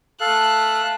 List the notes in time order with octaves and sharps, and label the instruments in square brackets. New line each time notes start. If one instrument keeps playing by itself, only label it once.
[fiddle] A3 F#6 [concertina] A4 F5